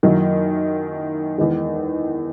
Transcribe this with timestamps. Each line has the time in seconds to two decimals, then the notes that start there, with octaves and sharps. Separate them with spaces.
0.03 F#2 D#3 F#3 A#3 E4
1.37 E2 D#3 G#3